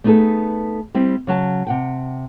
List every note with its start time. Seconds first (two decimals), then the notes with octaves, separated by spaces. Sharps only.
0.04 A3 B3 D#4 G#4 A4
0.94 G3 C4 E4
1.27 C#3 F#3 A5
1.67 C3 F#5 G5